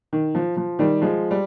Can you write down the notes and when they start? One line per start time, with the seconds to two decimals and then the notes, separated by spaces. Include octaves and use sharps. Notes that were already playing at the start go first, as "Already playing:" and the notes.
0.13 D#3
0.35 F3
0.57 F3
0.79 D#3 G3
1.01 F3 G#3
1.31 G3